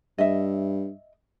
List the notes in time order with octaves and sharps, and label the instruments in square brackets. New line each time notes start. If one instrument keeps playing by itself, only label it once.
[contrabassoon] G2 [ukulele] D#5 E5